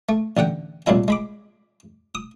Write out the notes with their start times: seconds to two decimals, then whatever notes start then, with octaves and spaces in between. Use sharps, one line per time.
0.09 A3
0.37 A1 D3 F#5 G5
0.86 C2 A#2 F#3 G#3 E4 G#5
1.08 G#3 B5 D6
2.15 D#6